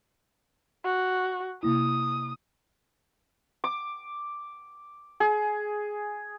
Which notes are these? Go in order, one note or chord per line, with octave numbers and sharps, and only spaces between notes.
F#4
C3 A#3 E4 D#6
D6
G#4